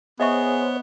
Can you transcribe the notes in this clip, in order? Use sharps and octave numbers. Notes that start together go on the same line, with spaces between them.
B3 G#4 C5 C#5 D#5 E5 C#6